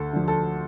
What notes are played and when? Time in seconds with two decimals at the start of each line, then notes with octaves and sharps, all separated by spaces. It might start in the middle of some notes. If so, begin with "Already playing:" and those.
Already playing: D2 A4
0.13 D3 F3
0.28 A4